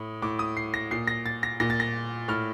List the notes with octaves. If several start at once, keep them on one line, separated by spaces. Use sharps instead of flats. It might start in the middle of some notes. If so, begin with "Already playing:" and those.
Already playing: A2 D#6
A2 D6
D#6
C7
A#6
A#2 C7
A#6
A6
A#6
A#2 A#6
A6
A#6
A2 F6